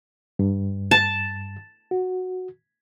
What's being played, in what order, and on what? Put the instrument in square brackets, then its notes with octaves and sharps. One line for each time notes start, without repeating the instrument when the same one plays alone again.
[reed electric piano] G2
[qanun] A5
[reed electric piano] F#4